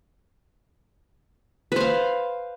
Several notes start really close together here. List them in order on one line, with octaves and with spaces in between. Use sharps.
B4 C5 F5